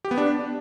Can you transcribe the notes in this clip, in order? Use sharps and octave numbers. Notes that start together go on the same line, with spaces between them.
G4
B3
D4